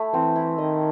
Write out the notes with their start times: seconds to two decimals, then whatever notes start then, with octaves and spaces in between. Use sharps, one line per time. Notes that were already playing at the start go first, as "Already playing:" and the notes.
Already playing: A3 E4
0.14 E3 C4
0.36 E4
0.58 D#3 D#5